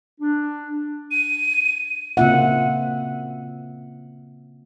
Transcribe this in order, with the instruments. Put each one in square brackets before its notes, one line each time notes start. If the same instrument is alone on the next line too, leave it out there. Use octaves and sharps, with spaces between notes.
[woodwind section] D4
[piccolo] D#7
[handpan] C#3 A#3 C4 F4 E5 F#5